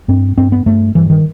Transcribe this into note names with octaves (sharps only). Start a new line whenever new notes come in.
G2 C4
G2 C4
B3
G2 A3
G2 E3
D#3